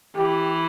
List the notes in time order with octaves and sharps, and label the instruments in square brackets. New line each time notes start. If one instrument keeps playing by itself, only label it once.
[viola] E3 [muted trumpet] G4